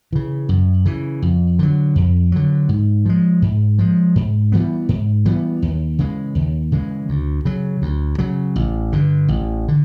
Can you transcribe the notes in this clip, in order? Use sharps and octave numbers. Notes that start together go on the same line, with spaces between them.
C#3 E3
F#2
C#3 E3
F2
D3 F#3
F2
D3 F#3
G#2
F3 G#3
G#2
F3 G#3
G#2
E3 G3 B3
G#2
E3 G3 B3
D#2
C#3 E3 G#3
D#2
C#3 E3 G#3
D2
C#3 F#3
D2
C#3 F#3
A1
G2 D3
A1
D3